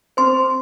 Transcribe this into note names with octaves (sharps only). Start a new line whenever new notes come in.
C4 C5 C6